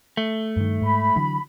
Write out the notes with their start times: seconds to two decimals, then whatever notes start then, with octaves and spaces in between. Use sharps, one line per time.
0.17 A3
0.57 G2 D#3
0.82 G#2 B5
1.16 D3 E3 F#3